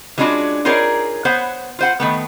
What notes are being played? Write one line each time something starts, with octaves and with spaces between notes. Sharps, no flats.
E3 G#3 C#4 D4 F4 F#4
D#4 F4 G#4 A#4 C#5 D5
B3 C5 C#5 F#5
F4 C5 F#5
D#3 A3 B3